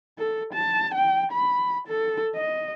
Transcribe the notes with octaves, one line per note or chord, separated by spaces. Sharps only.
A4
A5
G5
B5
A4
D#5